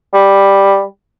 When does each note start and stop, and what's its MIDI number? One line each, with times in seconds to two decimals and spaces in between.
0.13 0.83 55